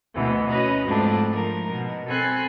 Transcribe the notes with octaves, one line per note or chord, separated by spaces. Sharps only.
D2 B2 E3
C#4 F#4 B4 D#5 A#5
F2 G#2 A3 D4
F3 D#4 A#4
B2
C4 A4 G#5 B5 C6 F#6